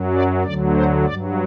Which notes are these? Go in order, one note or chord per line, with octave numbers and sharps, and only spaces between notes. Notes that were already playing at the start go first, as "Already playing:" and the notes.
Already playing: F#2 F#3
D5
D2 D3 F#3 D5
C5
G2 F#3 D5